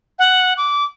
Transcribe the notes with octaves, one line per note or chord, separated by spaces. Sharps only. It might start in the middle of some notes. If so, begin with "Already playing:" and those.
F#5
D6